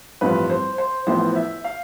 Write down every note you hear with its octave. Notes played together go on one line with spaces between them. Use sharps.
A1 G2 F3 C4 B4
C5
C5
A1 A2 F3 B3 C5
E5
F5